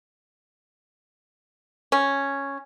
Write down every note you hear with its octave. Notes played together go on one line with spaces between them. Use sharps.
C#4